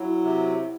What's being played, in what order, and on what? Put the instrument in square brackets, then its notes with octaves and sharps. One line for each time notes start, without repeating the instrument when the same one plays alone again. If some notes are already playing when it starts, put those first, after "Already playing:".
Already playing: [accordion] F#3 [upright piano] E4
[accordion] C3